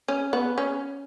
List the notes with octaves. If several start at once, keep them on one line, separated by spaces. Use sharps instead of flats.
C#4
B3
C#4